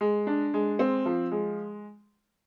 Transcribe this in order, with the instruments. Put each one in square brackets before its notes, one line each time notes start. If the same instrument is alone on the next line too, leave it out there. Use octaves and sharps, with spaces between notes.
[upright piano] G#3
D4
G#3
C4
F3
G#3